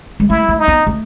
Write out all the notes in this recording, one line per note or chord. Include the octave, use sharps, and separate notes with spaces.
G#3
A3 E4
A3
D#4
B3
A3